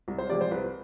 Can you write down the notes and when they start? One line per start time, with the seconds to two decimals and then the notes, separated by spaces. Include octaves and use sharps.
0.08 C2
0.18 C5
0.29 C3 F3 G#3 D5
0.41 C5
0.51 C2 B4